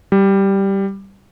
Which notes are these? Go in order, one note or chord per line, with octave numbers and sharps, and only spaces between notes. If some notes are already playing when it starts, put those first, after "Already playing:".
G3